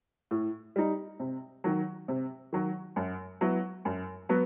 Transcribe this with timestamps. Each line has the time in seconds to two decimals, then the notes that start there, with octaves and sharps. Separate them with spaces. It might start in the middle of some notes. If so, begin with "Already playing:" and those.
0.31 A2
0.76 G3 D#4
1.20 C3
1.64 D#3 F#3
2.08 C3
2.53 D#3 F#3
2.96 F#2
3.41 F#3 B3 E4
3.85 F#2
4.29 F#3 B3